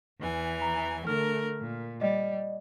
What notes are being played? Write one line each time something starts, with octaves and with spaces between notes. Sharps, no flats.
E2 E3 G#5
A#5
D3 A3 A#4 F6
A#2
G3 D5 D#5